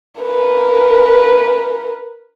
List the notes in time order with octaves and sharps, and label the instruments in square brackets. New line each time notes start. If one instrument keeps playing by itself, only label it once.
[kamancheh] A#4 B4